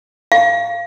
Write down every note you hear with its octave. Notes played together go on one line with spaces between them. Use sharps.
F5